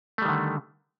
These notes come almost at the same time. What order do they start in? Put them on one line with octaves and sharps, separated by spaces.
A3 G3 D#3 D3